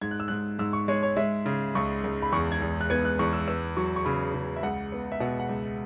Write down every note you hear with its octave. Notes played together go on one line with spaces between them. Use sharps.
G#2 G#6
F#6
E6
G#2 F#6
G#2 E6
C#6
G#3 C#5
C#5
G#3 E5
C#3
C#2 C#6
C#2
B5
E2 C#6
G#6
E2
F#6
B3 G#6
F#6
E2 C#6
E6
B3 E6
F#3 C#6
C#6
C#3 B5
C#3
E5
C#2 F#5
B3
E5
B2 F#5
F#5
C#2